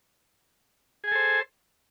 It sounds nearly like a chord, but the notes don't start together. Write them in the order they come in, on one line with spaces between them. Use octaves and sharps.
G#4 G#5 A4 C5